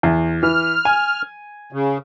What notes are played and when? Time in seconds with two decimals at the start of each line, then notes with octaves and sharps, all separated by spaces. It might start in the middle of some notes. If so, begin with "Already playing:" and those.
0.03 E2
0.43 E3 F6
0.85 G#5
1.72 C#3